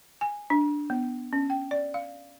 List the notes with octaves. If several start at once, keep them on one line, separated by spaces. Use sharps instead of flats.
G#5
D4
B3
C#4
G5
D5
F5